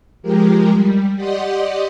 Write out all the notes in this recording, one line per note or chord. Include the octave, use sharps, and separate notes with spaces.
F3 G#3 G4 A#4
G3
G4 D5 D#5 F#5 C6 D#6